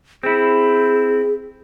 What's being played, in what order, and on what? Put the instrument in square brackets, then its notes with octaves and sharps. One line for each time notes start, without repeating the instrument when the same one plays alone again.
[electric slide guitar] C4 E4 [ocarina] G#4